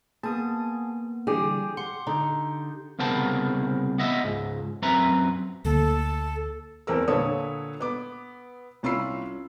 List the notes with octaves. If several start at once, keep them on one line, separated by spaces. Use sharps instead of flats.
A#3 B3 G#4 A5 D#6
D3 E3 G3 G4 G#4
F#5 C6 C#7
D3 D#4
C2 C#3 B3 A#4 C5 A5
B3 D#5 E5
C#2 G#2
F#2 C4 B4 E5 A#5
D2 D3 A#3 A4
E2 C4 A4 A#4 E6
A#2 D3 A4 B4 C#5 D#6
B3 D6
C2 C#4 F4 B5 E6 C7